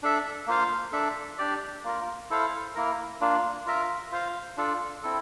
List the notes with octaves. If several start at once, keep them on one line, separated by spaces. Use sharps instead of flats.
D4 A4 E5
A#3 F4 C5 F5
D4 A4 E5
D4 G4 D5
A#3 F4 A#4
E4 A4 C5 F5
A#3 E4 A#4
A#3 D4 F4
F4 A#4 E5
F4 C5 F5
D4 F4 A4
C4 E4 A4